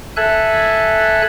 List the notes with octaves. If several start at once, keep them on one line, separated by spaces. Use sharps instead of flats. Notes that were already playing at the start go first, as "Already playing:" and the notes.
A4 E5 G#5 F#6